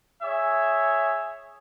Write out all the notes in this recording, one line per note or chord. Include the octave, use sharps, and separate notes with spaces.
G#4 C#5 E5